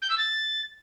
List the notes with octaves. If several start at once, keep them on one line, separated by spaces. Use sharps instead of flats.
G6
E6
A6